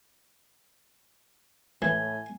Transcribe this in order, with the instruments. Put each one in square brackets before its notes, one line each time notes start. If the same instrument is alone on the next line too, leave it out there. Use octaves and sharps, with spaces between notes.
[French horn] A2 [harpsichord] E3 [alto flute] G#5 [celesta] G#6 G7